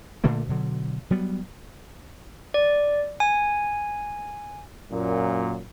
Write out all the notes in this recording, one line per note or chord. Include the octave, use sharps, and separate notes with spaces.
A#2 D3 A3 A#3
B2 D3 F#3
F#3 G3 B3
D5
G#5
F#2 A#2